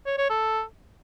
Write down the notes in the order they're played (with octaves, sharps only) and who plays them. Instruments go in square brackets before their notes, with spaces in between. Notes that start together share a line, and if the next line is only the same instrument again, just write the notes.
[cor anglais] C#5
C#5
A4